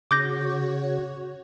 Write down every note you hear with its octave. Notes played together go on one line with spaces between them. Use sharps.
C#3 F#4 C#5 D6 G6 A#6